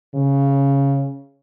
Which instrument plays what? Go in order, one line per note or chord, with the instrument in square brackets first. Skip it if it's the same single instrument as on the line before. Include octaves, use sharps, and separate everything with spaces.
[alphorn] C#3